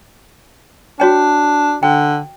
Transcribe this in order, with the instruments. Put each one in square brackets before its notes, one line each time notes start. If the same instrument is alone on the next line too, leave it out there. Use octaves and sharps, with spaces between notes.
[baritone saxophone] D4 [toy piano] F#4 C#5 G5
[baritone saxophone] D3 [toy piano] G5